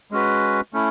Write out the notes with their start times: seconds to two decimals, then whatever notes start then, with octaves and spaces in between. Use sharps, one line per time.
0.11 G#3 C#4 F#4 B4
0.73 A3 C#4 E4